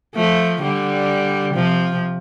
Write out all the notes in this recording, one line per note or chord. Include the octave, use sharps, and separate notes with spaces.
F3 A3
D3 G3
C3 F3